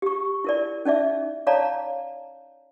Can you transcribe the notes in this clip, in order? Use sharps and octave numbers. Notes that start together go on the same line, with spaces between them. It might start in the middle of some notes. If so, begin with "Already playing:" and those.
G4 C#6
E4 A#4 D5
C#4 D#4 D5 E5
C#5 D5 F5 A5 A#5